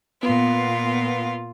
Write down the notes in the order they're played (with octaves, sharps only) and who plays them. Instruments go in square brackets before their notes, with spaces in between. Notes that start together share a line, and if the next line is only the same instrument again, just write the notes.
[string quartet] A#2 F4 [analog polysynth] B3